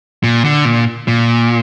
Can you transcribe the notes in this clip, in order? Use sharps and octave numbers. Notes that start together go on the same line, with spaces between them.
A#2
D3
A#2
A#2